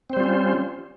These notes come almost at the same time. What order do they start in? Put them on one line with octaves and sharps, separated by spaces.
C4 C5 G3 F4 C#4